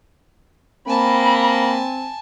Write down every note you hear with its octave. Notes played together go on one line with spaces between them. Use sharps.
A#3 C4 G#5 A5 B5